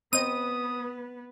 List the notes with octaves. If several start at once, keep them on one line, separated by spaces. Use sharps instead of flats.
B3 C4 B4 D#5 D#6 D#7